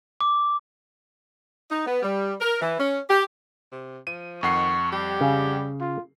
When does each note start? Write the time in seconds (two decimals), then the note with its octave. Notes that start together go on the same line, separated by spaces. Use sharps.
0.21 D6
1.70 D#4
1.86 B3
2.03 G3
2.41 A#4
2.61 E3
2.79 C#4
3.09 G4
3.72 C3
4.07 F3 D#7
4.43 F2 D#3 F#5 C#6 C7
4.92 G3 G4
5.21 C#3
5.80 F4